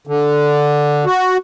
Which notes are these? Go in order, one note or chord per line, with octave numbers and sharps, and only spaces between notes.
D3
F#4